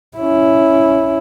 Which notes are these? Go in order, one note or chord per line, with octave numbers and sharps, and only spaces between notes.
C#4 E4